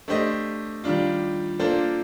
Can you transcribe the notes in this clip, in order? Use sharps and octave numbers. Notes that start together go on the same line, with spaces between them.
A3 D4 G4 C5 D#5
D#3 G3 D4 F4
A#3 D4 F4 A4 C5